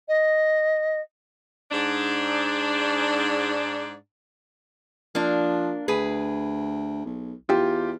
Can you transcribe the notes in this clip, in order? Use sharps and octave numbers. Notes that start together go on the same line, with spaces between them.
D#5
G#2 D4
F3 A#3 D4
D2 G#4 B4
B1
E2 F4 G4